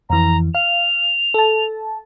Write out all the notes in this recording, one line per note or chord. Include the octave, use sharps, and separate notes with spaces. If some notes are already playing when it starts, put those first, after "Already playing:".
F2 E3 A#5
F5 F7
A4 A5